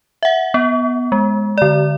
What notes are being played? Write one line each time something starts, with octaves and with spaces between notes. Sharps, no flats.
E5 F#5
B3
G#3
D3 D5